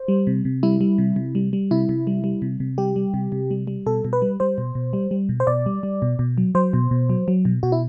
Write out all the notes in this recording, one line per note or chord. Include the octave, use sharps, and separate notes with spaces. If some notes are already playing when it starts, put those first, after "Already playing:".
Already playing: C5
G3
C3
C3
G3 E4
G3
C3
C3
G3
G3
C3 E4
C3
G3
G3
C3
C3
G3 G4
G3
C3
C3
G3
G3
B2 A4
B2
B4
G3
G3 C5
B2
B2
G3
G3
B2
C5
B2 D5
G3
G3
B2
B2
F#3
F#3 C5
B2
B2
F#3
F#3
B2
B2 F#4
E4